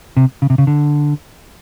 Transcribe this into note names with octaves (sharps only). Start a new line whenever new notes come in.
C3
C#3
C3
C#3
D3